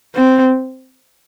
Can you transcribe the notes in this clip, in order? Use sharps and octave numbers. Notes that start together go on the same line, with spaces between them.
C4